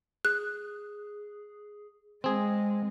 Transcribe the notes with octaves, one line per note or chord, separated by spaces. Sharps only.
G#4 F#6
G#3 C4 G#4